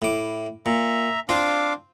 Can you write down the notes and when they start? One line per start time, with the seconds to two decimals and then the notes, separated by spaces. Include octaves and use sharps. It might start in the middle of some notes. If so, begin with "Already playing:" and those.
0.02 A2 D6
0.66 A#2 E5 A#5
1.29 C4 D4 F4 F5 D6